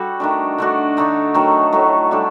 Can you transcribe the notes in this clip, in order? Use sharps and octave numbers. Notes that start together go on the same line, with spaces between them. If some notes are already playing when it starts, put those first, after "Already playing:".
Already playing: G3 F#4 A4
D#3 A3 D4
D3 A3 D4 F#4
D3 A3 D#4
D#3 F#3 A3
A2 F#3 A3
G3 D4 A4